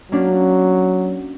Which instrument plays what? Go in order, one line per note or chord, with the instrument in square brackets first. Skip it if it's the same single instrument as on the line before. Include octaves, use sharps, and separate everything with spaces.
[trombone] F#3 [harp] A#3 C#4 D4